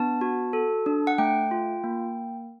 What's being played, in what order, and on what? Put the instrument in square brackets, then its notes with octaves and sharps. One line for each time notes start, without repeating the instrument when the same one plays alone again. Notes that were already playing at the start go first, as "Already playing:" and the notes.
Already playing: [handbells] B3 D4 A5
F#4
A4
D4
F#5
A3 G5
F4
A#3